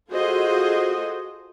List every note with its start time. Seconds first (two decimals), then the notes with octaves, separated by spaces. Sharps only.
0.10 F4 F#4 G#4 A4 C5 D#5